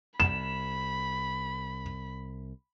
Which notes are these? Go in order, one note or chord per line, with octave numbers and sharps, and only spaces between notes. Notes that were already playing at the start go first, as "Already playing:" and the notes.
C2 B5 E7